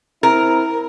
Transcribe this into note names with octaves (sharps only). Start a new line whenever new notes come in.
C4 E4 A#4